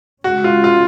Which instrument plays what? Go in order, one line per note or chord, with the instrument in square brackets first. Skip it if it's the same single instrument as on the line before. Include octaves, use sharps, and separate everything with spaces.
[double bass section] C#3 G#3 C#4 [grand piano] F#4
[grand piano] F4
F4